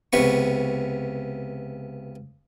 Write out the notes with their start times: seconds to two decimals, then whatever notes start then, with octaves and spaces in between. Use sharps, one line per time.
0.13 C#2 C3 B3 C#6